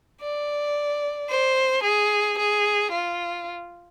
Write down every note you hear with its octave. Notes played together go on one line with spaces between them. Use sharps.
D5
C5
G#4
G#4
F4